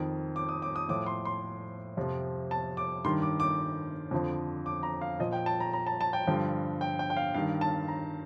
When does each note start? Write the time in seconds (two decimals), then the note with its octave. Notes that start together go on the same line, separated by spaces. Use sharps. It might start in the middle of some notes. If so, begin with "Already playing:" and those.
Already playing: F2 D#3
0.36 D6
0.49 D#6
0.62 D6
0.76 D#6
0.89 A2 F3 D6
1.06 C6
1.25 C6
1.97 F2 C3 F3
2.51 A5
2.77 D6
3.04 G2 D#3 C6
3.22 D6
3.40 D6
4.11 F2 D3 F3
4.66 D6
4.83 A#5
5.02 F5
5.19 A#2 F3 D#5
5.33 G5
5.46 A5
5.60 A#5
5.73 A#5
5.87 A5
6.01 A5
6.13 G5
6.27 G2 D3 F3
6.81 G5
6.99 G5
7.10 G5
7.17 F5
7.34 G2 D#3 F5
7.61 A5
7.88 A#5